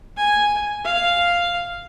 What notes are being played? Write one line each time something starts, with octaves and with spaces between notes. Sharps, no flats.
G#5
F5